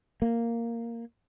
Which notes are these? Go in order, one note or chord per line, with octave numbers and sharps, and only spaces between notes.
A#3